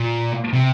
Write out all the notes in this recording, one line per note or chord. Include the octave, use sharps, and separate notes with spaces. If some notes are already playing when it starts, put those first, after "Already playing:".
Already playing: A#2
C3